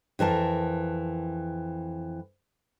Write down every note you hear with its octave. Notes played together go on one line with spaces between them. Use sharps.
F2 E3 A#4 A5